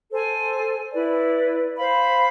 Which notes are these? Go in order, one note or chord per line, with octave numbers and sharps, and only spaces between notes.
A4 C5 G#5
E4 B4 D5
C5 F5 B5